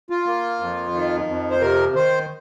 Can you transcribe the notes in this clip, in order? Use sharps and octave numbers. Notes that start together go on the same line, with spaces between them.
F4
A#3
F2
D#3
F2
C5
C3 A#4
D#3 C5